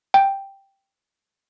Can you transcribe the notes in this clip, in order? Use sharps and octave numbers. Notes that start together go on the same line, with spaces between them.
G5